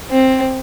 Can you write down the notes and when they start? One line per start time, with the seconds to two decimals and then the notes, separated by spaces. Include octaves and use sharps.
0.11 C4